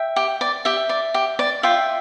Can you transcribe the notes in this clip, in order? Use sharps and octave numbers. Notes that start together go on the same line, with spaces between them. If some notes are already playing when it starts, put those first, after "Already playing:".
Already playing: E5 G5
G4
D5
G4 E5
D5
G4
D5
F4 E5 G5